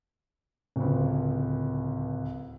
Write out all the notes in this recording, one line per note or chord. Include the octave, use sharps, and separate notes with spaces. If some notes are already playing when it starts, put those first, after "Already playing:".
D1 C#2